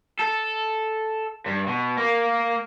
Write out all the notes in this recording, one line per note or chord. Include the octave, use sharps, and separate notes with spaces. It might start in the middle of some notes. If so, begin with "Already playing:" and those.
A4
G2
B2
A#3